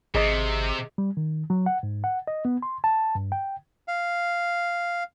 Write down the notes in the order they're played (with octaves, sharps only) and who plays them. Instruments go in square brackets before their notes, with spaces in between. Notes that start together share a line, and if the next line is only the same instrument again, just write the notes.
[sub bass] G#1 [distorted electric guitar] C3 [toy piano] G#4 D#5 D#6
[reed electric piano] G3
D#3
F#3
F#5
G#2
F#5
D#5
B3
C6
A5
G2
G5
[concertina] F5